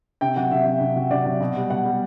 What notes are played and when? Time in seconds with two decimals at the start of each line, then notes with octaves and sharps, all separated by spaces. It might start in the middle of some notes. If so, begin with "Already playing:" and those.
0.21 C3 G5
0.36 F#3 F#5
0.51 C3 E5
0.66 F#3
0.80 C3
0.96 F#3
1.11 C3 D5
1.26 F#3
1.41 B2
1.56 G3
1.70 B2 F#5
1.85 G3